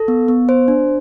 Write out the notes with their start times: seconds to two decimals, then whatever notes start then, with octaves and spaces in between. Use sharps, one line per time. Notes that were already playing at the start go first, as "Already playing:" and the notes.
Already playing: A4
0.08 B3
0.28 B3
0.49 C5
0.68 D4